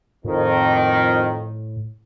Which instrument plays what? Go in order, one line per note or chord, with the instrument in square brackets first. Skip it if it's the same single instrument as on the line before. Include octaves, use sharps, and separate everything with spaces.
[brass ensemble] F2 D#3 [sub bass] A2